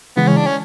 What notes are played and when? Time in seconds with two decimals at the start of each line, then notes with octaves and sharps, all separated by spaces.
0.17 C#3 E3 G#3 B3
0.27 C#4
0.37 D4
0.46 C#4